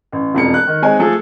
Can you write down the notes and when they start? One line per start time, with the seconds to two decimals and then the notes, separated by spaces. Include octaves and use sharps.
0.12 A1
0.34 E1 F2 C#7
0.54 F#6
0.67 D#3
0.82 G#3 C4 D#4 C#5 G#5
0.99 F3 A3 G#4 A4